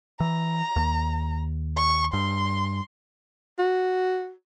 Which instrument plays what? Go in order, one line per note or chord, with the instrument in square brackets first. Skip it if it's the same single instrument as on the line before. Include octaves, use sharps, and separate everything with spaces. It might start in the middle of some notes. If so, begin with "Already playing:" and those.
[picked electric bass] E3 [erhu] A#5
[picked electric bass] D#2
[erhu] C#6
[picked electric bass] G2 [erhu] C6
[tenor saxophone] F#4